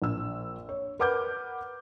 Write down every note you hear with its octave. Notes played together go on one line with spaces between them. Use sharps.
A#1 E6
C#5
A#4 B4 F#5 D6 F6 G6